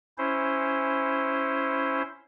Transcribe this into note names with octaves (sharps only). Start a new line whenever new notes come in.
C#4 E4 C5